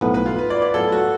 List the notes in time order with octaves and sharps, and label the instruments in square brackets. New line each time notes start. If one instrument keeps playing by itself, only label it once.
[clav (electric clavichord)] B1 A2 F3 B3 [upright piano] B4
[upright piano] B4
F4
B4
D5
D5
[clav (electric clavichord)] A2 F#3 B3 F4 [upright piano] A4
[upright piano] F#4